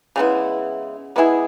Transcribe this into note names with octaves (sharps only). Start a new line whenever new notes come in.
C#3 G#3 B3 E4
G#3 B3 E4 G#4